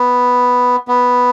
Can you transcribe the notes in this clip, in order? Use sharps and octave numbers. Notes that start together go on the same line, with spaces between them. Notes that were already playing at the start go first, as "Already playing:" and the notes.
Already playing: B3
B3